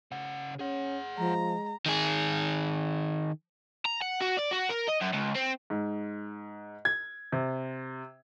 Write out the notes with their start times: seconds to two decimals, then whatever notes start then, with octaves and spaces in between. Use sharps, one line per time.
0.12 C#3 F#5
0.59 C#4 G#4 F#5
1.18 F3 G#3 A#5
1.86 D#3 G#4
3.86 A#5
4.02 F#5
4.20 F#4
4.37 D5
4.51 F#4
4.69 A#4
4.88 D#5
5.01 F#2
5.13 C#2
5.35 C4
5.70 G#2
6.85 G#6
7.32 C3